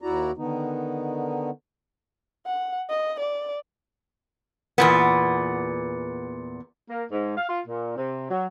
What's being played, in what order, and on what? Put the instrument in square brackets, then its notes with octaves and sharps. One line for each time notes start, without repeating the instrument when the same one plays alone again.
[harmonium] D#2 E4 F#4 D5 A#5
D3 D#3 B3 D#4
[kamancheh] F#5
D#5
D5
[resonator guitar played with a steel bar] E2 A#2 B3
[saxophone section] A#3
G#2
F5
F4
A#2
C3
F#3